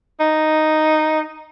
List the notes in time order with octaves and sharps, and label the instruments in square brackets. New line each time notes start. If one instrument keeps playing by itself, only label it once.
[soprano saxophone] D#4